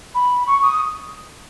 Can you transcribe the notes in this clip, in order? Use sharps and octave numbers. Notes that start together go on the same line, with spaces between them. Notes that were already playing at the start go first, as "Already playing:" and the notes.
B5
C#6
D#6